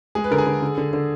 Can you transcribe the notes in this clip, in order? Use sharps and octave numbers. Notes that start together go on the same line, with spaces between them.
G#3 G#4
B4
D3 A#4
G#4
D3
D3
D3
D3